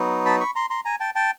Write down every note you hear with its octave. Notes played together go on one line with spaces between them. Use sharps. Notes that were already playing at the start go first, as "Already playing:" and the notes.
Already playing: F#3 B3 D#4
A5 B5
B5 C#6
A#5 C6
A#5 C6
G#5 A#5
G5 A5
G5 A5